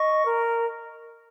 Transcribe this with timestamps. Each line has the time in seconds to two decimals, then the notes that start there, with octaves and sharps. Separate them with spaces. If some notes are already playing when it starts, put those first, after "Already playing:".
Already playing: D#5 C#6
0.27 A#4